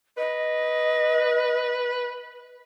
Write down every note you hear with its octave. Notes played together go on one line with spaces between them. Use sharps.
B4 D#5